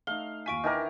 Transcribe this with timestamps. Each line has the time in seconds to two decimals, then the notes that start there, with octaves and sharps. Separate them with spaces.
0.07 A3 D#4 F5 G7
0.46 D#2 F4 G#5 C#6 B6 D7
0.64 D#3 E3 A#4 D#5 A5 D6